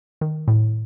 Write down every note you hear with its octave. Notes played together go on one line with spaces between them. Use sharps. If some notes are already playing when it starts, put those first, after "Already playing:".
D#3
A2